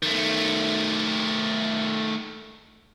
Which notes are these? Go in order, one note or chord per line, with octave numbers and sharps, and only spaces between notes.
D#3 A3